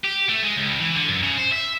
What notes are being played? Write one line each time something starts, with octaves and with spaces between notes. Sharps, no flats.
G4
A3
G#3
C#2
E3
D3
F#2
C#3
C5
E5